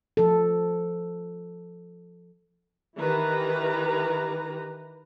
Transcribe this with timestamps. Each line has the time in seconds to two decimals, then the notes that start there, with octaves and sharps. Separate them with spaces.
0.17 F3 A4
2.97 D#3 E3 G4 B4 A#5